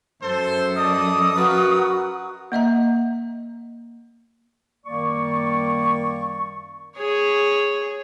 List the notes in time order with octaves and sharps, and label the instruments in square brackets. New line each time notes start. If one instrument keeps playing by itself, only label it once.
[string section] F#2 [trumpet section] A4 C5
[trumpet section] A4 D5 D#5 [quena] D#6
[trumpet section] F4 A#4 B4 [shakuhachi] F#4
[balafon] A#3 D#5 E5 A#5
[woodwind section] F#2 D#3 G3 A#3 D5 C#6
[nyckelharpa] G#4 C#5